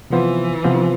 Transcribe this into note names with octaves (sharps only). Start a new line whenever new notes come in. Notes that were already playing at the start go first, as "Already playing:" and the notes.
C3 E3 F3 B3 F4 C5
C3 F3 B3 F4 C5